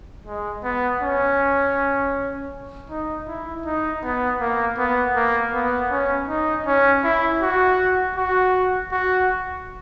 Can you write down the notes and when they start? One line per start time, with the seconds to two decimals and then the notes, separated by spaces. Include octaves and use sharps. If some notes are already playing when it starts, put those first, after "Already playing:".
0.26 G#3
0.63 B3
1.02 C#4
2.90 D#4
3.27 E4
3.65 D#4
4.03 B3
4.40 A#3
4.78 B3
5.15 A#3
5.54 B3
5.91 C#4
6.29 D#4
6.66 C#4
7.04 E4
7.42 F#4
8.16 F#4
8.92 F#4